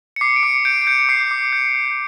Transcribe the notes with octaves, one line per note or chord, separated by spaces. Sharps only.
C#7
D6 C7
D7
D6 C#7
G6 D7
D7
G6 C#7
D6 C7
D6
G6
G6